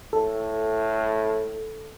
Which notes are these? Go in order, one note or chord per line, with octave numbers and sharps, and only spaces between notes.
A2 A4